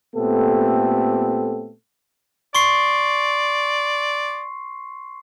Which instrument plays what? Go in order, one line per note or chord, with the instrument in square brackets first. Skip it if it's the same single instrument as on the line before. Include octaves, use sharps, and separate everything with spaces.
[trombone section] A#2 A3 B3 C4 G4 A4
[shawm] D5 [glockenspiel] C6 C#6 C7